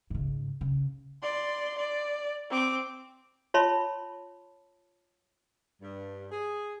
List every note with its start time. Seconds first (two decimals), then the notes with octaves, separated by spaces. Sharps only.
0.10 G#2 C#3
0.61 C#3
1.23 D5 C6
1.78 D5
2.50 C4 D6
3.54 F4 C#5 E5 A5 B5 C6
5.81 G2
6.31 G#4